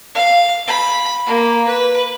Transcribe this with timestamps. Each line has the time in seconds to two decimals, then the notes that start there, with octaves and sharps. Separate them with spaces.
0.15 F5
0.68 B5
1.26 A#3
1.67 B4